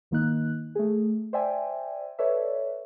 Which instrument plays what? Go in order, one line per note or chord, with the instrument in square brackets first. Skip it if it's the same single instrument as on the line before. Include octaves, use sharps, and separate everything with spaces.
[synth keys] G#1 D#3 A#3 D#4 F#6
A3 G#4
C5 D5 E5 G5 G#5
A4 B4 C#5 D5 E5